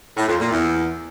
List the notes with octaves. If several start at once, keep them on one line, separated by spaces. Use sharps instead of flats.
A2
F2
A#2
E2